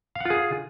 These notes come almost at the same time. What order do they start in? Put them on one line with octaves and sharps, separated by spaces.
F5 F#5 F4 G#4